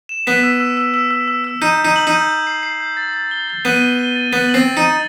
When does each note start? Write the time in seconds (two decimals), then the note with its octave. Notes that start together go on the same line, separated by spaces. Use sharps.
0.09 E7
0.27 B3 B6
0.43 E6
0.60 E6
0.77 E6
0.94 E6
1.11 E6
1.28 E6
1.44 E6
1.62 D#4 G6
1.78 G6
1.85 D#4
1.96 F#7
2.07 D#4
2.13 G6
2.29 G6
2.47 C7
2.63 C7
2.80 G6
2.97 A6
3.14 A6
3.31 G7
3.48 A6
3.65 B3 D#7
3.81 G7
3.99 G7
4.15 A6
4.32 B3 A6
4.49 F#7
4.54 C4
4.65 A6
4.77 D#4
4.83 A6